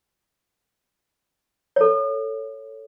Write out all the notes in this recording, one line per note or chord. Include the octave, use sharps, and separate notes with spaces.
A4 C#5